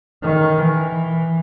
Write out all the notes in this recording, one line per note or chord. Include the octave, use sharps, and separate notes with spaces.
D#3
E3